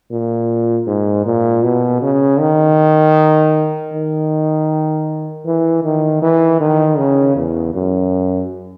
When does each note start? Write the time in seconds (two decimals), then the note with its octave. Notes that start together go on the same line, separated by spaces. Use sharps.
0.11 A#2
0.87 G#2
1.25 A#2
1.63 B2
2.02 C#3
2.39 D#3
3.93 D#3
5.46 E3
5.83 D#3
6.22 E3
6.60 D#3
6.98 C#3
7.36 E2
7.74 F#2